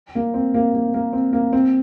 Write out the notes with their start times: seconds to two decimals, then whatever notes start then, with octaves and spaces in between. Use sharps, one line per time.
0.15 A#3
0.34 C4
0.54 A#3
0.74 A#3
0.94 A#3
1.13 C4
1.33 A#3
1.53 C4